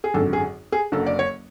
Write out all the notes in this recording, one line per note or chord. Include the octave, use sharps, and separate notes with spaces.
G#4
G#1 F#2 D3 A4
G#4
G#4
F#1 F#2 D3 F#3 A4
D5
C#5